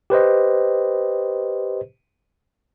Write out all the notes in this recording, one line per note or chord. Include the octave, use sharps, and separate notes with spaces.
G4 B4 C5 D#5